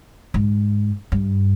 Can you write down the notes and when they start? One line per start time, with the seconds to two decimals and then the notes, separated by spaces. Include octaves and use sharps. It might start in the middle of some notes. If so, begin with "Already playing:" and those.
0.34 G#2
1.12 G2